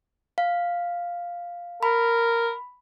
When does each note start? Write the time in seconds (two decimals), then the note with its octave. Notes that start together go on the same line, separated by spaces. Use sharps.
0.38 F5
1.83 A#4 B5